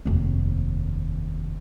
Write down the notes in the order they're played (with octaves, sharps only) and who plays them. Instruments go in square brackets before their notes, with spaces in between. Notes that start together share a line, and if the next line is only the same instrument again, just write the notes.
[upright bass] F1 D#2